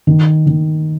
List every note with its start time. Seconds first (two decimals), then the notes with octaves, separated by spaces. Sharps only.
0.07 D#3
0.47 D#3